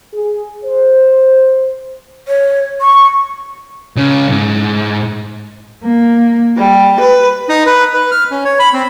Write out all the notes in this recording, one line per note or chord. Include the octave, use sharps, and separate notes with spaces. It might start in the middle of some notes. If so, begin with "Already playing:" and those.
G#4
C5
C#5
C#6
C#2 C#3
B1 G#2
A#3
G3
B4
D#4
B4
B4
F6
C#4
C#5
B5
C4